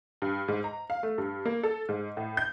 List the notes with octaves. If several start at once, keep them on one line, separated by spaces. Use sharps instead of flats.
G2
G#2
A#5
F5
A3
G2
A#3
A4
G#2
A2
G6